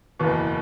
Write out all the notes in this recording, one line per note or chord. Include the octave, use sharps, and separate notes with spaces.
F#1 E2 B2